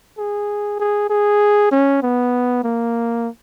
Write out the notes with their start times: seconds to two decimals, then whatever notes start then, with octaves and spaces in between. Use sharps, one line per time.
0.18 G#4
0.79 G#4
1.10 G#4
1.72 C#4
2.03 B3
2.64 A#3